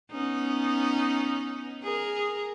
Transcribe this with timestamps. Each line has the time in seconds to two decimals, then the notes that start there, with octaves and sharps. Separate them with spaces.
0.12 B3 C#4 D#4
1.83 G#4 A#4